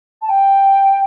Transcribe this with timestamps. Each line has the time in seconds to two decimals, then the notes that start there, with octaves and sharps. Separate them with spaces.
0.22 A5
0.29 G5